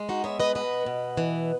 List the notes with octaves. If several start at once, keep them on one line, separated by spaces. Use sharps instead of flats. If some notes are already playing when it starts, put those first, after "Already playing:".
Already playing: G#3
D#4 F#4
B3 C#5 E5
B4 D#5
B2 B4 D#5
B2
E3